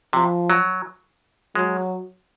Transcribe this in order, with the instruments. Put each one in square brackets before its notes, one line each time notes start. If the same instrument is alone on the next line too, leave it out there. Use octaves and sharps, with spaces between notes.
[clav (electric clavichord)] C3 [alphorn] F3
[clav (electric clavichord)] F#3
[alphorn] F#3 [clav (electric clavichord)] G#3